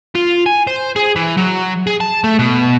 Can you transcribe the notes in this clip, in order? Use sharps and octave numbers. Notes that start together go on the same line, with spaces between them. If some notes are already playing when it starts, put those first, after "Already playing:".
F4
G#5
C5
G#4
E3
F#3
G#4
A5
A3
B2